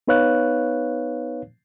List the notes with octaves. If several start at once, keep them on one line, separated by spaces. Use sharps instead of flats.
B3 D#4 B4 C#5 F5 F#6